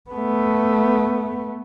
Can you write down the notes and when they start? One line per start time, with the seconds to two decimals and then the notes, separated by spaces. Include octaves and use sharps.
0.10 A3 B3